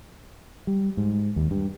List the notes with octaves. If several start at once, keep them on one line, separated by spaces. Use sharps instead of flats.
G3
G#2
D#2
G2